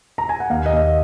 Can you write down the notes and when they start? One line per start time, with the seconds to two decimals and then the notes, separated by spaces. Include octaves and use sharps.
0.18 A#5
0.29 G#5
0.40 F#5
0.50 D#2 F5
0.66 D#5
0.73 D#2
0.82 D#5